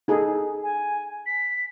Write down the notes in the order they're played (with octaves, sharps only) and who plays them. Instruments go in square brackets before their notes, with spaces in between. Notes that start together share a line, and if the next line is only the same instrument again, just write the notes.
[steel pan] D#4 G#4 A4
[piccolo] G#5
B6